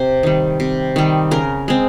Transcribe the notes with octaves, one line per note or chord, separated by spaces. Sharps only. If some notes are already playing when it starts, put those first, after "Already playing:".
Already playing: C3 C5
D#3 G3
C3
D#3 G3
C#3 A#4
G#3 C4